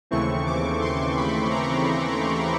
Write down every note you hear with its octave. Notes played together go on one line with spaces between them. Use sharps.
D#2 C#3 E3 A3 C4 C#6
D6
C6
B5
A#5